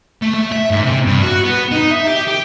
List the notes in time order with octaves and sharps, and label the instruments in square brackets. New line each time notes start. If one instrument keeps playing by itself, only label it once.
[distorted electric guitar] A3
A3
E5
G#2
C3
G2
F#4
B3
D#4
E5
G4
G4